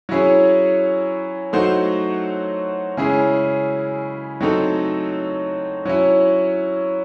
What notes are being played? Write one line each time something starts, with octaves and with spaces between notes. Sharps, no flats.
F#3 C#4 E4 G#4 C#5
F#3 A3 D#4 F#4 C5
C#3 G#3 C#4 E4 G#4
F#3 A3 C4 D#4 A4
F#3 C#4 E4